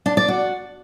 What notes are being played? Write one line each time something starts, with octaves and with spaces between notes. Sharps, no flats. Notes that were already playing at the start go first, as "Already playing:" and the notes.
D4
D5
F#4